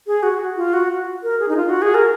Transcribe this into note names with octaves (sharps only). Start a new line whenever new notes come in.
G#4
F#4
F4
F#4
A#4
G#4
D#4
F4
F#4
G#4
A#4